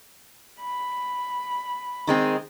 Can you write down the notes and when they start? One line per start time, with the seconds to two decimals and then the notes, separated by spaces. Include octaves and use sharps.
0.59 B5
2.07 D#3 G#3 C4